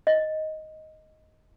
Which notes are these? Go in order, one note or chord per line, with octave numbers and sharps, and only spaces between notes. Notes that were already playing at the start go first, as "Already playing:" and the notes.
D#5